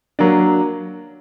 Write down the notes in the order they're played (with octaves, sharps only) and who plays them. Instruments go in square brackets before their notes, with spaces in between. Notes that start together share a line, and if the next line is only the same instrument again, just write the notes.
[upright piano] F#3 A#3 D4